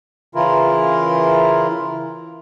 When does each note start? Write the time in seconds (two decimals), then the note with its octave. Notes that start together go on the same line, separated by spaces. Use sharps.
0.35 C#3 E3 E4 F4 A#4